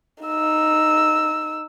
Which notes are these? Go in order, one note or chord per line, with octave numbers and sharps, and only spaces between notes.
D#4 E6